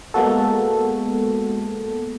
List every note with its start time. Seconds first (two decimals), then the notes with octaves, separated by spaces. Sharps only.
0.14 G#3 A#3 B3 F#4 A4